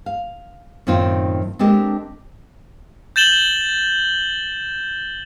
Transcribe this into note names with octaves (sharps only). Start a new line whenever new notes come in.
F5
F#2 A2 D#3 C4 D#4 F4
G#3 C4 D4 G4 A4 A#4
G6 A6 E7 F#7 G7